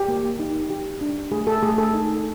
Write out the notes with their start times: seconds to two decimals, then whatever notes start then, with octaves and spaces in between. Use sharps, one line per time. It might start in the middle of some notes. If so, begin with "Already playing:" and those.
Already playing: G4
0.08 A#3
0.39 D#4
0.70 G4
1.01 D4
1.32 A3 G#4
1.47 A4
1.62 A3 G#4
1.78 A4
1.94 D#4